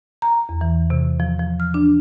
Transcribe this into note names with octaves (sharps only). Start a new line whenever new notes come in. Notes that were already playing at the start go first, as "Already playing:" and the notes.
A#5
E2
E3
C3
F3
F3
F6
D4